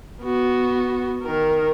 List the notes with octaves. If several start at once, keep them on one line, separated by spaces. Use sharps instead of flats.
B3 F#4
D#3 A#4